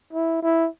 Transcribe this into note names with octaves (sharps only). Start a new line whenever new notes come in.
E4
E4